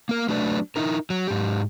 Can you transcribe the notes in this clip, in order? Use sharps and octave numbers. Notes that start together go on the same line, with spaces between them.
A#3 A#4
F#3 A3 D4 B4 D5
D#4 E4 A#4
F#3
G#2 G4